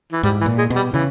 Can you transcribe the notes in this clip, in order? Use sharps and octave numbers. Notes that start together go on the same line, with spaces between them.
E3
G#2 G3
E3
A#2
G#3
B2
G3
C#3 E3